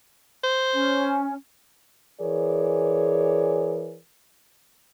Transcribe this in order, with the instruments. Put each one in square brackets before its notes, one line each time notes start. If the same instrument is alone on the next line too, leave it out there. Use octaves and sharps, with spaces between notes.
[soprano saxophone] C5
[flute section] C#4
[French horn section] E3 G#4 A#4 C#5 D5